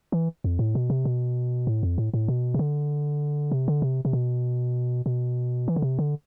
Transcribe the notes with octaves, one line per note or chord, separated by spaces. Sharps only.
E3
F2
A2
B2
C3
B2
A2
F2
A2
A2
B2
C3
D3
C3
D3
C3
C3
B2
B2
E3
D3
C3
D3